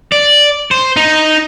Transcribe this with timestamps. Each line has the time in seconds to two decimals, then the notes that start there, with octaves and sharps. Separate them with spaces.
0.12 D5
0.71 C5
0.97 D#4